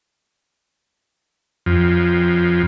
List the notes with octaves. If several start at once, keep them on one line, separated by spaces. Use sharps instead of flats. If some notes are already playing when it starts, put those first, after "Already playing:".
F2